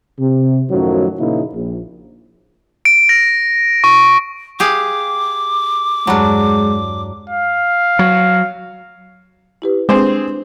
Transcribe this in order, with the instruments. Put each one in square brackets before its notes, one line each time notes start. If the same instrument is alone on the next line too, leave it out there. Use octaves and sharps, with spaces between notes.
[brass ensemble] C3
F#2 A2 D#3 F3 F#3
A#2 C#3 F3 A#3 D#4 E4
A#1
[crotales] D7
A#6
C#6
[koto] G4 G#4 F5 [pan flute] D6
[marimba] E2 G2 F6 [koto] F#3 D4 [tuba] G#3
[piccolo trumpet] F5
[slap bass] F#3
[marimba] E4 G4 B4
[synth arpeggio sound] G#3 [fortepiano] C4 G#4 C5 [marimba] D4 B4